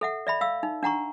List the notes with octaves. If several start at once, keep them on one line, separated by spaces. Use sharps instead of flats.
A4 E5 F#5
D5 E5 B5
F5 E6
D#4
D4 F#5 A#5 C#6